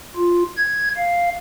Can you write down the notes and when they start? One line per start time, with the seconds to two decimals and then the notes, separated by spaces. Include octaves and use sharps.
0.16 F4
0.57 G#6
0.97 F5